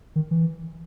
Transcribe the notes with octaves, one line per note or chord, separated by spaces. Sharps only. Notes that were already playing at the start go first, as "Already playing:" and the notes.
D#3
E3